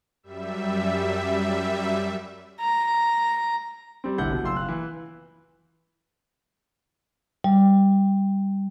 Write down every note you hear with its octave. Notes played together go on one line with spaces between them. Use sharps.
F#2 G3 E5
A#5
G3 C4
F1 A#1 D3 E4 F#5 G6
B2
F#1 F4 C6 E6
F5 F#6
E3
G3